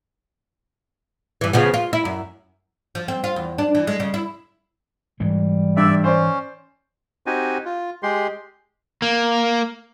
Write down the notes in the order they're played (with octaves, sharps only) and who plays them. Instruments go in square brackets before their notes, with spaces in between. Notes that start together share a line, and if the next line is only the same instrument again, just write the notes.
[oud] G2 E3
C#3 F3 B3
F4
E4
F#2
F3
C4
F4
E2
D4
E3
G#3
C#3
E4
[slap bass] G#2 E3 G#3 [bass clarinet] G3
[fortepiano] G2 E6 [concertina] D5 E5
[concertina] C#4 [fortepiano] C5 D5
[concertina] C4 D#4 F#4 G4 G#5
F4
G#3 G4 C6
[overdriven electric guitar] A#3